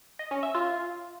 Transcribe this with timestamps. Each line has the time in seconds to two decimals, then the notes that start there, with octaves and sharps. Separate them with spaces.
0.19 D#5
0.31 C#4
0.43 E5
0.55 F4